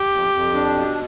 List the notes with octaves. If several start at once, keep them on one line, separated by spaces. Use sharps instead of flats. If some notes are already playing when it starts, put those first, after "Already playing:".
Already playing: G4
F2
F2
D4
B2